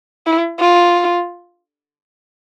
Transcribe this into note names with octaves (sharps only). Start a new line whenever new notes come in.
E4
F4